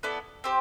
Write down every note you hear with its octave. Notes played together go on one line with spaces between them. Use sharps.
B3 E4 A4 D5
C4 G4 C5